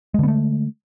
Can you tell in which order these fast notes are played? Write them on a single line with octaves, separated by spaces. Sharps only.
G#3 D3 B3 A3